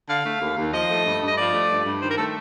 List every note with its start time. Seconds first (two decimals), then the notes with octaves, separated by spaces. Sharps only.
0.09 D3 F5
0.25 A3
0.41 D#2
0.57 D#2
0.73 F3 D#5
0.90 A3
1.05 G2
1.22 G2
1.27 D#5
1.37 F3 D5
1.54 A3
1.70 G2
1.86 G2
2.02 D#3 C5
2.10 A#4
2.18 A3 A4